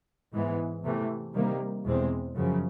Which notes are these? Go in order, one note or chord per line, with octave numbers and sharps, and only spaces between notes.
G#2 E3 G#3 B3
E2 C3 E3 A3
C3 D#3 G3 A#3
E2 B2 G#3 C4
F#2 C#3 F3